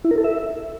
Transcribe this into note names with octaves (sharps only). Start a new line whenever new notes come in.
E4
A#4
A4
E5